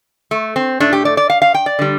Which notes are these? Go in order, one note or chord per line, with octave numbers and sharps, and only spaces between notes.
A3
C4
A2 A3 D4
G4
D5
D5
F5
F5
G5
D5
D3 G3